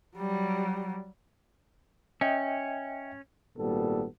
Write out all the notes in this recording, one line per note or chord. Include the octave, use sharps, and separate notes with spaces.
F#3 G3
C#4 D#5 E5 G5
G#1 A#2 G3 B3 A4